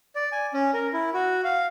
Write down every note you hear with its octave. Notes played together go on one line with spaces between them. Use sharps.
D5
G#5
C#4
A#4
E4
F#4
F5